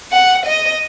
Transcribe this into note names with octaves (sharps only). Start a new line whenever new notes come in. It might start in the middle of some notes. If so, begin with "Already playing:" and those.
F#5
D#5